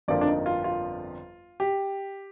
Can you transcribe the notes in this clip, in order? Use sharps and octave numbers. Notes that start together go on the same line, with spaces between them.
G1 F2 D3 F3 A#3 D5
D4
D#4
F4
F4
G4